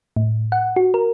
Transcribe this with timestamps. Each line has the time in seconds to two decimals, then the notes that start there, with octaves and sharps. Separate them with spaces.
0.16 A2
0.52 F#5
0.76 F#4
0.94 A#4